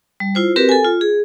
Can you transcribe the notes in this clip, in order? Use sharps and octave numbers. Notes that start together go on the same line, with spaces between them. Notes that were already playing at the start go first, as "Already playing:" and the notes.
G3
E4 F4 C5
C4 F#4 G4 A#4 B4
A4 G#5
F4
G#4